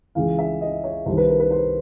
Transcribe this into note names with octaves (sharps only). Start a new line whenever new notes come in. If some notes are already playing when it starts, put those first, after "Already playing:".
C#2 C#3 E3 F5
E5
D#5
C#5
C2 C3 D#3 C5
B4
A#4
B4
C5